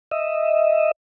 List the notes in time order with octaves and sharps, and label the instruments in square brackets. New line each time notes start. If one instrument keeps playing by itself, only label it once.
[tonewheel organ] D#5 E5